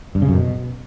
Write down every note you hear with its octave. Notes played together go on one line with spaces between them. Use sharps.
G2
C#3
F#2
B2